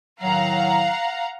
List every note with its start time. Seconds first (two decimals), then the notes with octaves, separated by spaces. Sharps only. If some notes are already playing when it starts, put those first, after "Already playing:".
0.21 A2 D#3 F#3 F5 F#5 A#5